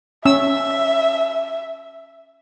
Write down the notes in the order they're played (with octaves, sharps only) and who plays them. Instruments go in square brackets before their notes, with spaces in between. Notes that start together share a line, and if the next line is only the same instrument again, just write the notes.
[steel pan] C#4 E6 [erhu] E5